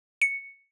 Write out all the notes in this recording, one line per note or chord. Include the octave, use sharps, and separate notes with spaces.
C#7